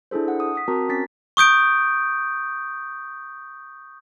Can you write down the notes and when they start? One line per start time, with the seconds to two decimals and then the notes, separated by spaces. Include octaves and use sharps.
0.11 D4 E4 G#4 A4 C5
0.28 F#5
0.40 D#6
0.55 D#6 B6
0.68 C4 F#4 A#4 A5 A#5
0.89 C#4 A6 B6
1.37 C#6 D#6 G6 D7